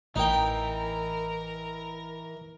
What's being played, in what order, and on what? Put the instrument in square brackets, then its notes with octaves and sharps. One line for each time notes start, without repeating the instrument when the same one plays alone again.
[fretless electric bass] A1 [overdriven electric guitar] E3 [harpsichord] D#4 G5 [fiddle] A#4